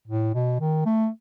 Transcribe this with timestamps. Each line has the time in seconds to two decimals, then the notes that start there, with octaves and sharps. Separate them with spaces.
0.07 A2
0.34 B2
0.60 D#3
0.86 A3